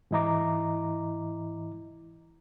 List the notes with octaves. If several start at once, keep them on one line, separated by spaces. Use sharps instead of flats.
G#2 E3 E4 D#5 A#5 D6